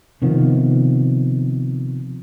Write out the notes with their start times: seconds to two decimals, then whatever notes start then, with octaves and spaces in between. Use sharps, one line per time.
0.22 C3 D#3 F3 B3